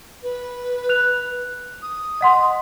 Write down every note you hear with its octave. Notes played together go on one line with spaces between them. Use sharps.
B4
F#6 F7
D#6
D#5 F#5 C6